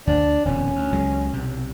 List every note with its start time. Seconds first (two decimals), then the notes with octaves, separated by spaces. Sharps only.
0.07 D2 D4
0.45 D#1 F2 B2 C#4
0.76 D2
0.92 C#2 F#3 G#3
1.33 B1 C3